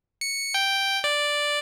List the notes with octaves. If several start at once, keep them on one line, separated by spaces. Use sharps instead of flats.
C#7
G5
D5